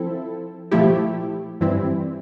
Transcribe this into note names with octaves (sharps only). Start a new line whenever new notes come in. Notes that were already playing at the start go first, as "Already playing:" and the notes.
Already playing: F3 C4 E4 A4
A#2 F3 A3 E4 G4
G2 E3 G3 C4 E4